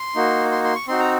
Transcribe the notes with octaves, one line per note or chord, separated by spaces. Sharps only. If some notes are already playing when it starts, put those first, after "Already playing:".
Already playing: C6
A#3 D#4 F#4
C6
C6
C#6
C4 D#4 F#4 C6
A#5